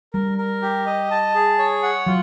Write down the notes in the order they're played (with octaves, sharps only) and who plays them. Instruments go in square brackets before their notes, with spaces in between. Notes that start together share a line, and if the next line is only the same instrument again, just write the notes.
[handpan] G3 [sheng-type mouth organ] A#4
[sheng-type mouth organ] A#4
G4
D#5
A5
G#4
C#5
F#5
[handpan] F#3 [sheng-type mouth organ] F4